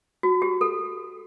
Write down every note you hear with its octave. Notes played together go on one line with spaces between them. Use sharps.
F#4
G4
A4